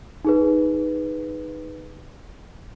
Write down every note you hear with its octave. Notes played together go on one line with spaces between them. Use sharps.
D#4 G#4 B4